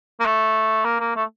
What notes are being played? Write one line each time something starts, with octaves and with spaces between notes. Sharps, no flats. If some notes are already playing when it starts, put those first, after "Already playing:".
A#3
A3
A#3
A#3
A3